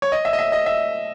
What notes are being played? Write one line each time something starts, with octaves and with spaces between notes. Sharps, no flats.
C#5
D#5
E5
D#5
E5
D#5
E5